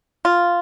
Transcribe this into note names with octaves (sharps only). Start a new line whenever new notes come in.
F4